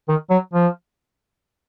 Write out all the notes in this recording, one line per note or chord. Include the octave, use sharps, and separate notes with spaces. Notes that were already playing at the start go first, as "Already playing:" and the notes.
D#3
F#3
F3